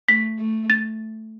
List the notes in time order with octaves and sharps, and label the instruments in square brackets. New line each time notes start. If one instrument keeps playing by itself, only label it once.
[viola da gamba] A3 [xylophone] B6
[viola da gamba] A3
[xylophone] A6